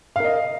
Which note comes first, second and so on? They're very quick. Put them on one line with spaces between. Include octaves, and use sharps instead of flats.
F5 A#4 D#5